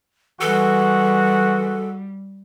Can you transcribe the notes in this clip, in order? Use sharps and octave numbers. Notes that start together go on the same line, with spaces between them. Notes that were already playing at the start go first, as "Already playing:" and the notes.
E3 G3 G#3 F#4 A4